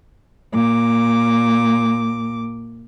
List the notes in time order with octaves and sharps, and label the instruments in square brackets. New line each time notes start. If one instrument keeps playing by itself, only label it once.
[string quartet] A#2 D6